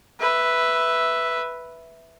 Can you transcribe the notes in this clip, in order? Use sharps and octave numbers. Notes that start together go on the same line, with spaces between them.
B4 E5